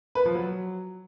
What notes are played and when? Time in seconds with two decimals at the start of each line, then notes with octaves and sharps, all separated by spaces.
0.15 B4
0.25 F3
0.35 F#3